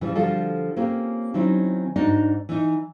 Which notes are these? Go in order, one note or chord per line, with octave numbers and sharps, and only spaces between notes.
C#3 E3 F3 G3
D3 F3 G3 F4 F#4 A4
A#3 C4 C#4 F4 G4 C#5
D#3 F#3 C4 C#4 D#4 E4
G#2 D4 D#4 F#4
E3 D#4